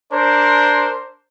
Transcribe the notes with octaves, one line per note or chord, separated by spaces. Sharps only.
D4 A#4 C5